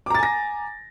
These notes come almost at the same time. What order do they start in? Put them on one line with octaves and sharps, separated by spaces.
D6 A#5 A6 G#5 A#6